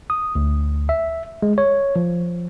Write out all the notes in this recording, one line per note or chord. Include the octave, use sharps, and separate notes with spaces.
D#6
D2
E5
G#3
C#5
F3